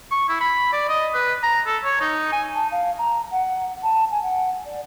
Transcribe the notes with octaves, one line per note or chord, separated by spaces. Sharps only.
C#6
E4
B5
D5
D#5
B4
A#5
A4
C#5
D#4
G#5
A5
F5
A#5
F#5
A5
G#5
F#5
D5